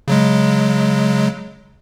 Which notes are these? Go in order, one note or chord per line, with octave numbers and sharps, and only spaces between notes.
C#3 F#3 G#3